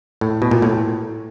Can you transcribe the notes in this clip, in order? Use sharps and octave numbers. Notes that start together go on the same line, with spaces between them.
A2
B2
A#2
A2